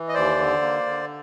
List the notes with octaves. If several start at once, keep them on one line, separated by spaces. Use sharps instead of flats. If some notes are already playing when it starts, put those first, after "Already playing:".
Already playing: E3
D#5
D#2 C5 D5
D3
A#3
D3